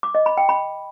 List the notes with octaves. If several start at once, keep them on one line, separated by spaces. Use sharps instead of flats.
D6
D#5
B5
G5
B5